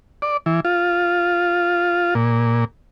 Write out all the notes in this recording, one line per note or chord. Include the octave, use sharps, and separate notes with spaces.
D5
E3
F4
A#2